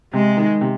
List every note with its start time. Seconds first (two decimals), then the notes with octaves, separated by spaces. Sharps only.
0.13 C3 G#3
0.37 D#3
0.61 C3